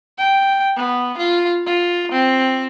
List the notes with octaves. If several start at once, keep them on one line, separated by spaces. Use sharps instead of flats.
G5
B3
F4
F4
C4